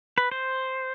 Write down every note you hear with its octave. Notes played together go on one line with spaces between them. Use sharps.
B4
C5